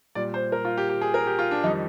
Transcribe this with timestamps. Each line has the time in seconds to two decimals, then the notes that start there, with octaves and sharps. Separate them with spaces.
0.15 A#2 G3 D5
0.34 C5
0.52 A#4
0.65 F4
0.78 G4
0.89 G4
1.01 G#4
1.14 A#4
1.27 G4
1.39 F4
1.51 D4
1.63 F2 D#3 G3 D#4